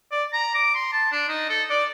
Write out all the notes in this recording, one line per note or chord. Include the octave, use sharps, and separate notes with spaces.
D5
A#5
D6
C6
A5
D4
D#4
A4
D5